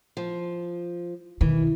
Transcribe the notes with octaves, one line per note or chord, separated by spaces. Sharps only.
F3
B2 D#3 E3